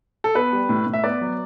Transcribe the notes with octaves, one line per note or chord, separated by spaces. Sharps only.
A4
B3 B4
G3
A2
A2
E5
B3 D5
F#3